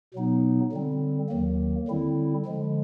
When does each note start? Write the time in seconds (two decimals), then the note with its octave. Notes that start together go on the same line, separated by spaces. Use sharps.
0.14 B2 F#3 B3 D#4
0.72 D3 G3 C4
1.29 D#2 D#3 F#3 A#3
1.88 D3 G3 C4 E4
2.45 D3 F3 G#3